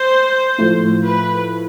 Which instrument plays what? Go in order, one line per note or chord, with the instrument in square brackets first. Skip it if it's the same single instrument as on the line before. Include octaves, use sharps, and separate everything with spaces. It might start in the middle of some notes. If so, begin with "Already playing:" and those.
Already playing: [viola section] C5
[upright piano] A2 F3 A3
[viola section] B4